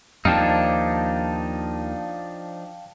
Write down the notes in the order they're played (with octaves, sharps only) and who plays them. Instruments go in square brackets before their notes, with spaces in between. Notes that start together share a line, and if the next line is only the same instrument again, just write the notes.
[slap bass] D#2 [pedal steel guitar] F3 D4 D#4 [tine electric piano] F5 G5 A5